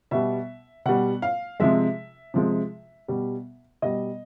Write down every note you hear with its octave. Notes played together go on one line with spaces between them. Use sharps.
B2 G3 E5
B2 G3 F#5
F5
C3 F3 G#3 E5
C3 F3 G#3
B2 G3
B2 G3 D#5